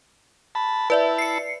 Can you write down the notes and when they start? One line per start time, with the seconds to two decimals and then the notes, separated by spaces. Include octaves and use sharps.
0.55 A5 B5
0.90 E4 B4 D5 E5 A5
1.18 C7 C#7